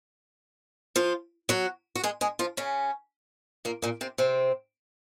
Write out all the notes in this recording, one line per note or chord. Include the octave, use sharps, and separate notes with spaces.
F3 F4
F#3 F#4
F#4
G#3 G#4
G#3 G#4
F3 F4
C#3 C#4
A#2 A#3
A#2 A#3
C3 C4
C3 C4